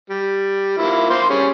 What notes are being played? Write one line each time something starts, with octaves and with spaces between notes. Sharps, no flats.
G3
F3 A#3 E4
A#3 C5 C6
G3 C#4 G#4